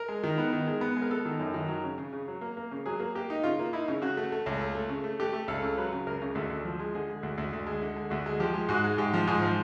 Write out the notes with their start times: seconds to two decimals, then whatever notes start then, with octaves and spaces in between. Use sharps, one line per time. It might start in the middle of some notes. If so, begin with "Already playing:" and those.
Already playing: A#4
0.08 G#3
0.23 D#3
0.38 B3
0.53 D#3
0.67 G#3
0.81 B3
0.96 G#3
1.02 A#4
1.10 B3 A4
1.25 D#3
1.40 F#2
1.54 D#3
1.68 F#3
1.84 C#3
1.98 C#3
2.13 C#3
2.28 F#3
2.41 A#3
2.57 A#3
2.71 C#3
2.86 F#3 G#4
3.00 A#3
3.15 A#3 G4
3.30 D#4
3.43 C#3 F4
3.59 A#3
3.73 D#4 E4
3.88 C#3
4.02 C#3 F#4
4.17 A3
4.32 A3
4.46 C#2
4.61 A3
4.75 A3
4.89 C#3
5.04 A3
5.20 A3 G4
5.33 A3
5.48 C#2 A4
5.62 C#3
5.78 F#3 B4
5.93 C#3
6.07 C#2 A#4
6.22 C#3
6.35 D2 A4
6.50 D2
6.65 F3
6.79 G#3
6.95 D3 G#4
7.09 G#3
7.23 D2
7.38 D2
7.53 D2
7.66 G#3
7.82 D3
7.96 G#3
8.10 D2 F#4
8.26 G#3
8.40 F3 G4
8.54 G#3
8.69 G#2 F#4
8.84 G#3
8.98 G#2 G4
9.14 F3
9.27 G#2 G#4
9.42 F3